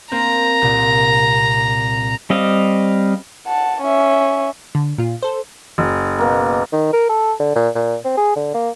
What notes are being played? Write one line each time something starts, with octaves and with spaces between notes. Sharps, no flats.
A#3 C4 A#5
C2 A#2
G3 C4 D#5 F5
F#5 A5
C#4 E5
D3
A#2 F4
A4 C5
F#1
B2 A#3
D#3
A#4
A4
D3
A#2
A#2
C4
G#4
D3
A#3